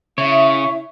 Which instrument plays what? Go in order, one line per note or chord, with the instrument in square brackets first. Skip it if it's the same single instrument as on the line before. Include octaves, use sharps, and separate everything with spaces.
[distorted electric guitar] C#3 [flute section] E4 E5 [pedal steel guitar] C#5